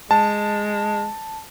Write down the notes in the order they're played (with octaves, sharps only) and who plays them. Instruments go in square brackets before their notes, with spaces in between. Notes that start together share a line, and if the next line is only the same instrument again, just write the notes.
[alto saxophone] G#3 [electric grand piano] A5